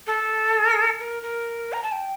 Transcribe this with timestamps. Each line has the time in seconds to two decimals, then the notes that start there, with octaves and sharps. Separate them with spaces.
0.07 A4
1.00 A#4
1.23 A#4
1.73 A#5
1.83 A5
1.92 G5